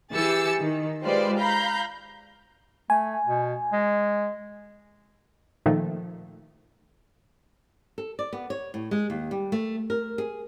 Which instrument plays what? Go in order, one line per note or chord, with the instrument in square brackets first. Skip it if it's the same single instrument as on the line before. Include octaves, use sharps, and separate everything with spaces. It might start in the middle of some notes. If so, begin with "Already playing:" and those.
[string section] E3 G4 G#4 E6 A6 C#7
D#3
G#3 F4 G4 B4 C5 D5
F5 A#5 B5 G6
[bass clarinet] A3 [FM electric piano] G#5
[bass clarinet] B2
G#3
[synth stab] A#2 D#3 F3 A3
[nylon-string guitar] A4
D5
B3
C#5
A2
G#3
D#2
G3
A3
A#4
G#4